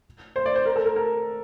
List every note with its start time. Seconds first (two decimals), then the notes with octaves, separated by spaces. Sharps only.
0.36 C5
0.46 D5
0.55 C5
0.66 A#4
0.76 A4
0.86 A#4
0.96 A#4